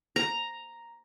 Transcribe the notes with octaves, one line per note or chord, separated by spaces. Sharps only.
A#5